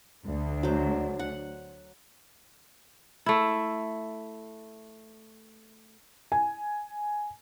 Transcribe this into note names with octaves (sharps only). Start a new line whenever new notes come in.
D2 D4
F#3 C5
F#5
A3 E4
G#5